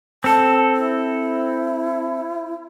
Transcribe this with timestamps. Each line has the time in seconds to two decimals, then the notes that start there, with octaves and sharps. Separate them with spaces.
0.24 C4 A4 A5
0.75 E4